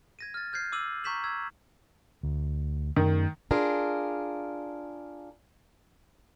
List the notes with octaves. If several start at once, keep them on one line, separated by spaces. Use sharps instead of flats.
G#6 A#6 D#7
F6 A6
F6 G6 G#6 C7
D6 E6 D#7 F#7
A#5 C#6 G6 B6 E7 F#7
E6 G#6
D2
F#2 D#3 A3
D4 F4 G#4 A#4